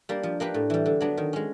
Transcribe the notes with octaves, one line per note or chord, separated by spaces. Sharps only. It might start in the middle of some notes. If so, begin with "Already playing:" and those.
G3 A#3 D4
F3
A#3 D4 G4 B4
A2
E3 G3
D3
F#3 B3 D4
D#3
G#3 C#4